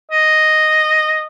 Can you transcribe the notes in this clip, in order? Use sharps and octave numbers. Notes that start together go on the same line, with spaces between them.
D#5